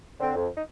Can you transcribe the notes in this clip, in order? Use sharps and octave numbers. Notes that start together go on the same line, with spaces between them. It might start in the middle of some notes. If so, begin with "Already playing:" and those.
D3 C4
F2
D#4